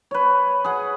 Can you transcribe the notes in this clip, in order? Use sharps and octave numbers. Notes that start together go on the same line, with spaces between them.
B4 C#5
G#4 F#5